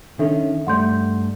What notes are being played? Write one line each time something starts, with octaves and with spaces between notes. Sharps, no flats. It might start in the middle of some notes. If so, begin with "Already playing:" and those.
D#3 C#4 D4 A4 E5
G2 A3 D5 F#5 C6 G6